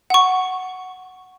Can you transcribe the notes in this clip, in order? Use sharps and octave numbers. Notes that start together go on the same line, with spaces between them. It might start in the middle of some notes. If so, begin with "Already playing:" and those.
F#5 C#6